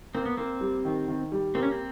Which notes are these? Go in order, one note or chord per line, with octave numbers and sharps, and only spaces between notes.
A#3 C4
B3
A#3 C4
G3
D#3
D#3
G3
A#3 C4
C#4
C4